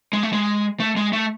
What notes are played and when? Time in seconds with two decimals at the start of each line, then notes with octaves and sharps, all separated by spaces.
0.13 G#3
0.23 A3
0.33 G#3
0.80 A3
0.97 G#3
1.13 A3